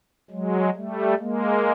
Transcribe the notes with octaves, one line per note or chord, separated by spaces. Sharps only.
F#3 G#3
G3 A3
G#3 A#3